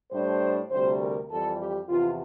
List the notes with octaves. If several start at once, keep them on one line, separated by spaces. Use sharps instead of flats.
A2 G3 D4 C5
D2 C3 G3 C5
A#4
F2 E3 G3 A4
G4
E2 C3 F3 F4